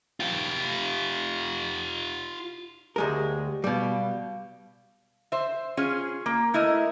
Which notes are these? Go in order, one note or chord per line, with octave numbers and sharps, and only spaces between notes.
F4 G4
D2 G#3 G4 A#4
B2 G3 F5
C5 E5
C#4 F4 G#4
A#3
A3 E4 A#4 D#5